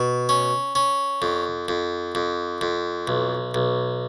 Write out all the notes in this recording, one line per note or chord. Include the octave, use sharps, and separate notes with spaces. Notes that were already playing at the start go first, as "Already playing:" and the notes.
Already playing: B2
C#4
C#4
F2
F2
F2
F2
B1
B1